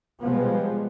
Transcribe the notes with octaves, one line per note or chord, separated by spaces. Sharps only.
B2 F3 G3 G#3 B3